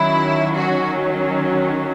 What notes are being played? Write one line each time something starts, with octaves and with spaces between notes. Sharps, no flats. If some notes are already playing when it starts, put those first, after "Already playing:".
Already playing: D#3 F#3 C#4 E4
F#4